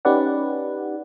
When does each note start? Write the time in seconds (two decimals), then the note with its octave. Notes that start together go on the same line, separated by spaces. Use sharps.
0.05 C#4 D#4 G4 B4 D5 F#5